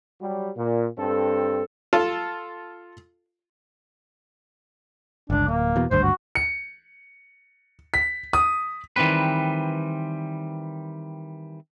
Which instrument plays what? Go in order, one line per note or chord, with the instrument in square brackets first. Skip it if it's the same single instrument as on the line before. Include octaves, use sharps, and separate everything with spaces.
[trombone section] F#3 G3
A#2
G2 C4 A4
[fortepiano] F4 A4
[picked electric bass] G1 C#2 [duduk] D4
[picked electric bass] D1 [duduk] A#3
[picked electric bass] E2 B2
[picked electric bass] G#1 D2 G2 [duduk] C5
[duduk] F#4
[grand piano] C#7
B6
D#6
[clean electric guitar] D#3 E3 G3 C4 B4